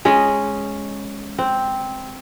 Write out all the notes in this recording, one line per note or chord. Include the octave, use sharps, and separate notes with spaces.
G#3 C#4 D#5
C4